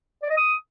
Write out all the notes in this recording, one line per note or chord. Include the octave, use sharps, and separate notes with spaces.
D5
D#5
D#6